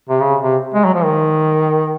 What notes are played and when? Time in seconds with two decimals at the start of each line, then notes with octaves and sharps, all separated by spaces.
0.09 C3
0.20 C#3
0.41 C3
0.74 G#3
0.85 F#3
0.94 F3
1.04 D#3